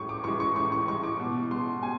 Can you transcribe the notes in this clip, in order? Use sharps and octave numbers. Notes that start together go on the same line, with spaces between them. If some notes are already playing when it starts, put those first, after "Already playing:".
Already playing: A2 E3 G#3 C#6
D6
E3 G#3 C#6
C#6
A2 C#6
C#6
E3 G#3 C#6
D6
B2
G#3 C6
B2 G#5